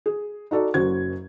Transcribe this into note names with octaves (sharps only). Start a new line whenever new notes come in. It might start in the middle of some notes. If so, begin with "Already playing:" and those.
G#4
D#4 F#4 A4 D5
F#1 F#2 F#4 C5 G#6